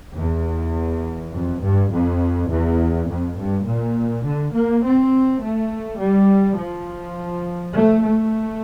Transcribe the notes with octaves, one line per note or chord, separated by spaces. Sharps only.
E2
F2
G2
F2
E2
F2
G2
A#2
D3
A#3
C4
A3
G3
F3
A3
A3